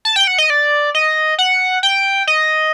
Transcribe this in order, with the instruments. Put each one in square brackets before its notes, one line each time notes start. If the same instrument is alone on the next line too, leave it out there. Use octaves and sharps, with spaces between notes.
[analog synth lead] A5
G5
F#5
D#5
D5
D#5
F#5
G5
D#5